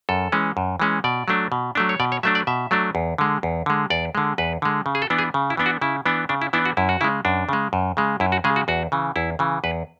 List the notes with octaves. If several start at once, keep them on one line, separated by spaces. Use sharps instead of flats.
F#2 A4
E3 G#3 C#4
F#2
E3 G#3 C#4
B2 D5
F#3 A3 D4
B2
F#3 A3 D4
C#5
B2 D5
C#5
F#3 A3 D4 E5
D5
B2 E5
F#3 A3 D4
E2
D3 G#3
E2
D3 G#3
E2 D5
D3 G#3
E2 B4
D3 G#3
C#3
G#4
A4
E3 B3 D4
G#4
C#3
E4
E3 B3 D4
F#4
C#3 E4
E3 B3 D4
C#3 D4
E4
E3 B3 D4 E4
F#4
F#2 E4
F#4
C#3 G#3 E4
F#2 D4
C#3 G#3
F#2
C#3 G#3
F#2 E4
F#4
C#3 G#3 G#4
F#4
E2 F#4
C#3 E3
E2 E4
C#3 E3
E2 B4